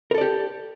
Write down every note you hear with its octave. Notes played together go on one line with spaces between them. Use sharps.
G4 A4 A#4 D5